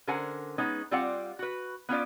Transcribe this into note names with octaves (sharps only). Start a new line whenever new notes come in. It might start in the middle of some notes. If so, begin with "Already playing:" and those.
D3 C#4 A#4 C5 F#5 G#5
G#3 B3 C#4 D#4
G3 C4 F4 D5 F5 F#5
F#4 B4
B3 C#4 F4 D5